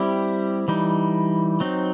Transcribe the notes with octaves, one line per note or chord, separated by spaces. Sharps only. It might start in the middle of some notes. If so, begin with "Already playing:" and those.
Already playing: G3 C4 E4 G4
E3 G3 D#4
F#3 C4 D#4